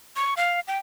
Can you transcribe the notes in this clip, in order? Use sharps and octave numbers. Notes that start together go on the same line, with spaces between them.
C#6
F5
G5